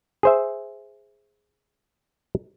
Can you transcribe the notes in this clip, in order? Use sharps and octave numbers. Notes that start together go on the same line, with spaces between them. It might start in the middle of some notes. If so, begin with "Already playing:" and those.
G#4 C5 E5